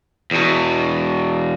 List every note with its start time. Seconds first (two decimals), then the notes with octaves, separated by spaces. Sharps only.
0.31 E2 B2